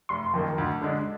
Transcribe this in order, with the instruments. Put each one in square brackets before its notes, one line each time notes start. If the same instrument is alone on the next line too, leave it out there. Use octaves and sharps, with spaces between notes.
[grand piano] F1 [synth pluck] C6
[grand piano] F2 D#3 A#3
D2
D3 G#3 D4